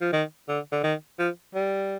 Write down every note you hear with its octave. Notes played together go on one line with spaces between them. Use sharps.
F3
D#3
D3
D3
D#3
F3
G3